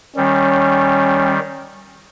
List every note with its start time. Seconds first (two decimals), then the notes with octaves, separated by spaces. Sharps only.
0.16 D#3 G3 C#4